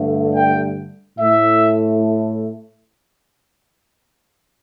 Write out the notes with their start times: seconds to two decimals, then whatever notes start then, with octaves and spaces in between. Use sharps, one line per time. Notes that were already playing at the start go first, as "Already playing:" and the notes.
Already playing: G2 D3 A3
0.36 G5
1.19 A2 A3 E5